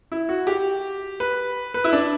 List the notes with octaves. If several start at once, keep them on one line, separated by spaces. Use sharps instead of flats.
E4
F#4
G4
B4
B4
E4
D4